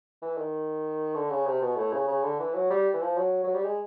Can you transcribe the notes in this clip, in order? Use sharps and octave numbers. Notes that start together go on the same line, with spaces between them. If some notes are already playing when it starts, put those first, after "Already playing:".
E3
D#3
D3
C#3
C3
B2
A2
C#3
C#3
D3
E3
F#3
G3
E3
F3
F#3
F#3
G3
G#3